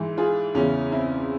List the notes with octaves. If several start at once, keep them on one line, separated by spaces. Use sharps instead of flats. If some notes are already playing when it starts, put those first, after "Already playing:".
Already playing: G#2 E3
F4 G#4
E2 C#3 E3 C#4 F4
C4 E4